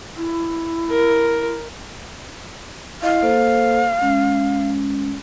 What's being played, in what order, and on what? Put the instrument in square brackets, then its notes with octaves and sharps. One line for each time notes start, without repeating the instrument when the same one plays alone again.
[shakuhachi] E4
[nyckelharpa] A#4
[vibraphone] E4 D#5 [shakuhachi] F5
[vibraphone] A#3 A4 C5
G#3 C#4